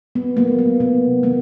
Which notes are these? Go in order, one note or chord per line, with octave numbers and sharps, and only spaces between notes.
B3
F#3 A3 A#3
B3
C3 B3
D#3 F#3 A3 A#3